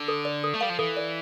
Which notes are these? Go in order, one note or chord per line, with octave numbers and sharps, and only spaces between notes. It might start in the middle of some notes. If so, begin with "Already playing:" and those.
Already playing: D3
A4
D5
A4
A3
G3 F5
F3
E3 A4
D5